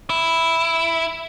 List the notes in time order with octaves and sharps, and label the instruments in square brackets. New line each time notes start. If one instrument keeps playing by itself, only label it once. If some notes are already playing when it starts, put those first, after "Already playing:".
[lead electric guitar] E4